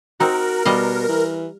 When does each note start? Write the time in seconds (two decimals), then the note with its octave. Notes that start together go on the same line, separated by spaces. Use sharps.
0.20 C4 D#4 F#4 A#4
0.65 B2 G3 D#5 F5
1.09 E3